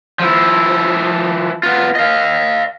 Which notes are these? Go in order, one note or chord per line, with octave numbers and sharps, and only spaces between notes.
F3 E4
B3 F4
D#5 F5